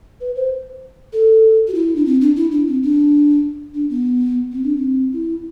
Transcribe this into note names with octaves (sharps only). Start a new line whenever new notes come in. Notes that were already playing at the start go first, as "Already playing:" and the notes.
B4
C5
A4
F#4
E4
D4
C4
D4
E4
D4
C4
D4
D4
B3
C4
D4
C4
E4